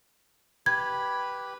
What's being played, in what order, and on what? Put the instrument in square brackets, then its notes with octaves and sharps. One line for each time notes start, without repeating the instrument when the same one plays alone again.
[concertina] G4 B4 B5 [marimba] G#6